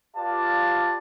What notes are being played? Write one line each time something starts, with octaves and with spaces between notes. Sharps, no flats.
F4 G4 B4 D5 F5 A5